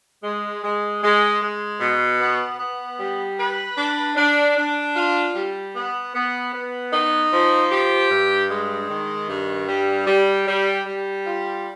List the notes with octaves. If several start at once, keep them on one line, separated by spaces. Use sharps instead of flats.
G#3
G#3
G#3
G#3
B2
B3
B3
G3
B4
D4
D4
D4
F4
G3
B3
B3
B3
D#4
F3
G4
G2
G#3
D#3
G2
G3
G3
G3
G3
F4